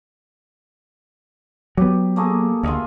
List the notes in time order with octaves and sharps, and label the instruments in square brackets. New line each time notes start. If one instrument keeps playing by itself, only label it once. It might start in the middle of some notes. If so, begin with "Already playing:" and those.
[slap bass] F#3 B3 [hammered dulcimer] G4
[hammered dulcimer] A3 A#3 G#4
[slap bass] D2 [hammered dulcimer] F4 D#5 E5